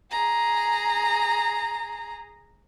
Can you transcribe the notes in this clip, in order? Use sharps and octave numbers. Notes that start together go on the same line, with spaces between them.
G#4 A#5